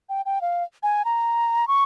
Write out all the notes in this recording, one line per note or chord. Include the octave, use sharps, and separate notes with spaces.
G5
G5
F5
G#5
A#5
C#6